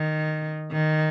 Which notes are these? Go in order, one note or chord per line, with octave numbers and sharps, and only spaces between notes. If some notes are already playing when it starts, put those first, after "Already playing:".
Already playing: D#3
D#3